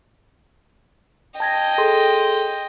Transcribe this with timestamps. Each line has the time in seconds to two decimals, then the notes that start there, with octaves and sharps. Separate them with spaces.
1.40 D#5 G5 A5 G#6 A#6
1.78 G#4 A4 C6